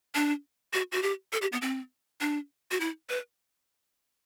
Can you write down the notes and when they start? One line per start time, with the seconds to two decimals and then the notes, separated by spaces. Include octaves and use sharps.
0.15 D4
0.73 F#4
0.92 F#4
1.03 G4
1.33 A4
1.42 G4
1.52 B3
1.62 C4
2.21 D4
2.71 F#4
2.80 E4
3.10 B4